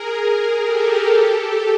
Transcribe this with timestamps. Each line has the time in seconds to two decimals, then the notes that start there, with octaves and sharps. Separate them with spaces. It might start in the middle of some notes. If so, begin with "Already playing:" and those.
Already playing: G#4 A#4
0.60 G4 A4
1.06 G4 A4